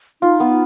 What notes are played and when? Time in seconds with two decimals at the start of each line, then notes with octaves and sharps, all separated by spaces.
0.22 D#4 F4
0.40 B3